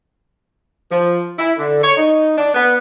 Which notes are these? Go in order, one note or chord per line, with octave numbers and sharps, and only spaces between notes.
F3
E4
D3
C#5
D#4
D4
B3